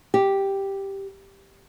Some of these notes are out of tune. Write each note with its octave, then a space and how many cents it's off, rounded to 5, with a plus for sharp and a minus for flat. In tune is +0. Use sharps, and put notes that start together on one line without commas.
G4 +0